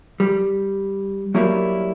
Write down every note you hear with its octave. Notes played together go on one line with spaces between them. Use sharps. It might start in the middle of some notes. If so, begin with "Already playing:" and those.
G3
F#3 G3 A#3 E4 F#4 A#4